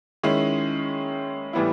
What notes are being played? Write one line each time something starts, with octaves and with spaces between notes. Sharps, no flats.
D#3 G#3 C#4 E4
A2 E3 G3 B3 E4